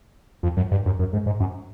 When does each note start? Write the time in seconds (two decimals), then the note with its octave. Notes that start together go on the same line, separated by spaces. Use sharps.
0.43 F2
0.57 F#2
0.71 G2
0.86 F#2
0.99 F#2
1.13 G#2
1.26 G#2
1.40 F#2